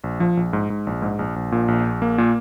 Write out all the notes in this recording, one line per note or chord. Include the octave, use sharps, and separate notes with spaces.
A#1
F3
A#1
G#2
G#2
A#1
G#2
A#1
A#1
A#2
A#1
A#1
A#3
A#2